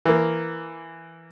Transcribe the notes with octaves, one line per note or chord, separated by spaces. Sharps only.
E3 A#3